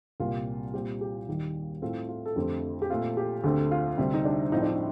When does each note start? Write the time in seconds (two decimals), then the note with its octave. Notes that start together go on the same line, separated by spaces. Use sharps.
0.20 C2 A#2 G3 A#3 F4
0.74 A#2 G3 C4 G4
1.01 G4
1.28 D#2 D#3 G3
1.82 A2 A3 C4 F4
2.09 F4
2.25 A4
2.36 F2 D3 A3 C4 G4
2.82 G4
2.90 A#2 A3 C4 F4
3.17 G4
3.44 D2 D3 A3 C4 G4
3.71 F4
3.98 D2 C3 G3 C4
4.14 D#4
4.25 D4
4.52 A2 F3 C4 D#4
4.62 D4
4.72 D#4